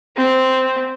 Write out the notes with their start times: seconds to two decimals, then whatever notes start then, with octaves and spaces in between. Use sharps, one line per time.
0.17 C4